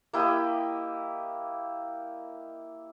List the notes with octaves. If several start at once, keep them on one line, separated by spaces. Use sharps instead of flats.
A#3 E4 G4 D#5